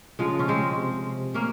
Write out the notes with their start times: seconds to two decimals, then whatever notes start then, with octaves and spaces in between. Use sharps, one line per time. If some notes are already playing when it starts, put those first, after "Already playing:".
0.19 C#3 F3 G#3
0.39 C#4
0.48 G#3 C4
0.77 C3
1.34 A#3 C#4